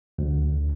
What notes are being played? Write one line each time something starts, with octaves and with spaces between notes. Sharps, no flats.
D2